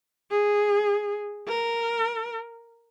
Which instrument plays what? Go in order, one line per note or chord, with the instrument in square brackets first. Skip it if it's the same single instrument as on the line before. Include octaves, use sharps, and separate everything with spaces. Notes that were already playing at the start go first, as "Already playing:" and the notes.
[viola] G#4
A#4